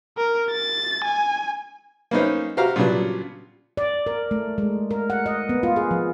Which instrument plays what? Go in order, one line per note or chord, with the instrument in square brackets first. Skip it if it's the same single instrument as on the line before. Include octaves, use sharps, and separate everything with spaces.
[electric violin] A#4
A6
G#5
[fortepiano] A#3 B3 C#4 D#4 C5
F#4 G4 C5 F5 A#5
A#2 C#3 F#3 G3 B3 D4
[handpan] D5
A#4
A3
G#3
A#4
F#5
D#5
B3
F4
G#4
F3